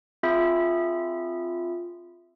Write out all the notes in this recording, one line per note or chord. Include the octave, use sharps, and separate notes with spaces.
C4 F4 G#4 E5 B5